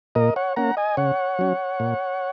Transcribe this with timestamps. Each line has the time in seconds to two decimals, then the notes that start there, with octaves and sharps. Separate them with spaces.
0.15 A#2 A#4 D#5
0.36 C#5 F#5
0.56 A#3 C#4 F#5 A#5
0.77 D#5 G#5
0.97 C#3 C#5 F#5
1.39 F#3 C#4
1.80 A#2